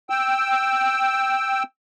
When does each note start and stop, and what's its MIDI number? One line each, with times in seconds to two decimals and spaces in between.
0.10 1.63 79
0.10 1.63 88